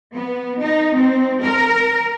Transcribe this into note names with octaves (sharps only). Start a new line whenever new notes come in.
B3
D#4
C4
A#4